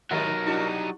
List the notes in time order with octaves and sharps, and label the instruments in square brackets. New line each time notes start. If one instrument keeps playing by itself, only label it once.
[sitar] G#2 D#3 [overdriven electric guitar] F#3 D#4 [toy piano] G4 D#5 F#5 [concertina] A#4
[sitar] G3 D4 F#4 [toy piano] E4